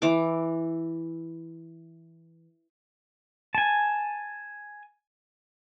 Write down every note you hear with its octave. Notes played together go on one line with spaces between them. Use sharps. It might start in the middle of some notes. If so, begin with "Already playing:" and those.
E3 D6
G#5 A5